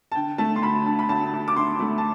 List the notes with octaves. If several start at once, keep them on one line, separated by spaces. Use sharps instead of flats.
A5
D3 G5
A3 A5
C6
D2 B5
D3 A5
B5
D2 A5
D2
D6
D2 C6
A3
A5